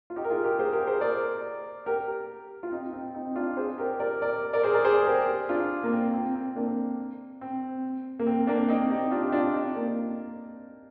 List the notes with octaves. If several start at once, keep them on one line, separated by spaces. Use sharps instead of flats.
F4
D#4 G4
A#4
F4 G#4
G4 A#4
G#4 C5
G4 A#4
G#4 C5
A#4 D5
G4 A#4
F4
C4 D#4
C4
C4 D#4
D4 F4
G#4 C5
G4 A#4
A#4 D5
A#4 D5
A#4 D5
G#4 C5
A#4 D5
G#4 C5
G#4
G4 A#4
D4 F4
A#3
C4
C4
C4
A#3 D4
C4
A#3
C4
A#3 D4
C4 D#4
D#4 G4
D4 F4
G4
D4 F4
C4 D#4
A#3 D4